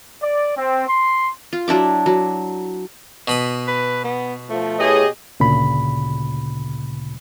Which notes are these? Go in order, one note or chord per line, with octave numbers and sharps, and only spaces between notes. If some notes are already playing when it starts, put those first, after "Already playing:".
D5
C4
C6
F4
F#3 D4 E4 D6
F#3
B2 B5 D#6
B4
B3
F3 A3
E4 G4 G#4 B4 C#5 D#5
D2 A#2 C#3 B5